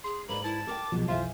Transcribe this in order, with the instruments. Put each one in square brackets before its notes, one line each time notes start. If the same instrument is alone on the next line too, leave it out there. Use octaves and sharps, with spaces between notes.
[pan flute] G#4 [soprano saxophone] C6
[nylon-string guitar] G#2 B4 D5 [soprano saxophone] A#3 [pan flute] B5
[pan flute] E4 [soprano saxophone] A5
[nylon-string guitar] A4 A#4 G5 [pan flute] D6
[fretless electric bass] B1 F3 [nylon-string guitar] B2 F#3 G#3
[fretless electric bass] B1 E3 [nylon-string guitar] F2 E5 G#5 [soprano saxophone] F4 [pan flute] C5